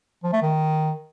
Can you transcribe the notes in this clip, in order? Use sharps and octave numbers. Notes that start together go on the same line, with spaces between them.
F3
A3
D#3